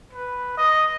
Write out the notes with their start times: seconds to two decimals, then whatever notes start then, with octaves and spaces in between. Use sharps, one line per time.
0.13 B4
0.57 D#5